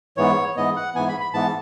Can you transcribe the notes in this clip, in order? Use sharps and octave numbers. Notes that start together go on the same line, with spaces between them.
G#2 E3 B3 C#5
G#2 E3 B3 D#5
F#5
G#2 E3 B3 G#5
B5
B5
G#2 E3 B3 A5